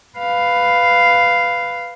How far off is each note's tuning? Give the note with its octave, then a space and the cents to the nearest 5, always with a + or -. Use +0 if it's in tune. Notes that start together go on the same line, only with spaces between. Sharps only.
B4 +10 F5 +0